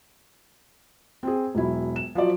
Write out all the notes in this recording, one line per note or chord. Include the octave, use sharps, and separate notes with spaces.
C4 G#4
E1 F#3 E4
E7
F3 F#3 D5